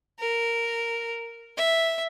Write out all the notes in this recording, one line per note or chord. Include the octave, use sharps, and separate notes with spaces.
A#4
E5